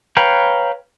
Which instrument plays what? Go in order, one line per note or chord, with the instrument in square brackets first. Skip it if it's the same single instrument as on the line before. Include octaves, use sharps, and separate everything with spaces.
[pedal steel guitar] B4 C#5 F5 G5 A#5